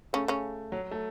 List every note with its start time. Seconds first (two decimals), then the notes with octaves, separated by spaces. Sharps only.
0.13 C#3 A3 C#4
0.28 C#3 C#4
0.72 F#3
0.91 A3